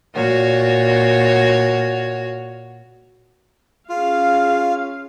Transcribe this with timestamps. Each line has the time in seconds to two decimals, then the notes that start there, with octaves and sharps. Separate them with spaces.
0.15 A#2 F#4 C#5
3.89 C#4 F4 G#4 F5